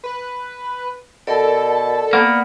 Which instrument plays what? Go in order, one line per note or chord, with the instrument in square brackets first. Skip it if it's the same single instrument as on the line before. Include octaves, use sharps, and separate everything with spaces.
[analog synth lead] B4
[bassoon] B2 [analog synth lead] A4 [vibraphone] A#4 D5
[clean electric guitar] A#3 [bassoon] B3